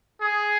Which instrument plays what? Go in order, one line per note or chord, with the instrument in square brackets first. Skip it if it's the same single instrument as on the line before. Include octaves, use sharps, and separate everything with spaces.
[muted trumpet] G#4